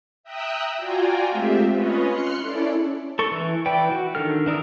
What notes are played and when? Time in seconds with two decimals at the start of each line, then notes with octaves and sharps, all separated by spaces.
0.23 E5 G5 A#5 D#6 E6 F#6
0.77 F4 F#4 D5 G5 G#5 A#5
1.28 G#3 A3 C4 F4 G4 E5
1.73 C#4 F4 B4 C#5 D#5
2.07 C6 F6 F#6 C7 C#7
2.38 C#4 E4 A4 D5
3.19 A4 C#6
3.31 E3
3.66 E3 B4 D5 G5
3.91 F#4
4.15 D#3 D4 A4 F6
4.46 E3 D4 A#4 D#6 E6